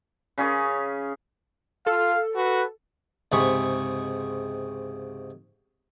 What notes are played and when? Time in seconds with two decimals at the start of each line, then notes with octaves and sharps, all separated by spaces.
0.38 C#3 C#4 G#4 C#6
1.87 F4 A4 F5
2.36 F#4 B4
3.32 C#2 G#2 C3 G#4 B5 C#6